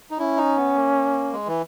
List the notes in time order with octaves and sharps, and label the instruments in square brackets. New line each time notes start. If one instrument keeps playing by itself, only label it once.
[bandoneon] D#4
[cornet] C#4 [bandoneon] E4
[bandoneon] D#4
B3
A#3
G#3
E3